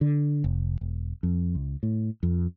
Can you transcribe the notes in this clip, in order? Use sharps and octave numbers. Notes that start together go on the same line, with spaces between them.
D3
F1
E1
F2
C#2
A2
F2